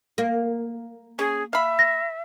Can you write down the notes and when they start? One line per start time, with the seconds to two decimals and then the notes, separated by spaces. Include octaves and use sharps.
0.18 A#3
1.19 C#4 G#4
1.53 E5 F5 B5
1.79 A#6